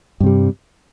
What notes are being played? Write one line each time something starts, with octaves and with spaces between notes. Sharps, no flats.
G2 C3 G3